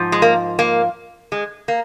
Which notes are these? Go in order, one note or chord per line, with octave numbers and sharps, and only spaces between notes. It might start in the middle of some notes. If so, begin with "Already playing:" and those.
Already playing: G#2 F3
G#3
A#3
A#3
G#3
A#3